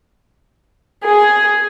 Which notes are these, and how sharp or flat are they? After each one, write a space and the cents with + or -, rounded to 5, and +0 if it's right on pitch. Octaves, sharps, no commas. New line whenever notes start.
G#4 +5